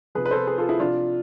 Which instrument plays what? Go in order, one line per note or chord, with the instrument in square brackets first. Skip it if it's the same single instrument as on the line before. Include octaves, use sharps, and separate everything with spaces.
[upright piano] C3 F3 G#4 B4
B4
A4 C5
G#4 B4
F4 A4
E4 G#4
C3 F3 D4 F4